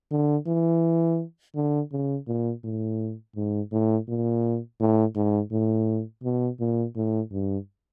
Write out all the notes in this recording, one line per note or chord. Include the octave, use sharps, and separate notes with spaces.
D3
E3
D3
C#3
A#2
A2
G#2
A2
A#2
A2
G#2
A2
B2
A#2
A2
G2